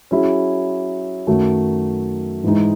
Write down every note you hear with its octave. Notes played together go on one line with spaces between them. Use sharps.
F#3 C#4 E4 G#4
F#2 D#3 F#3 A3
G#2 E3 G#3 D#4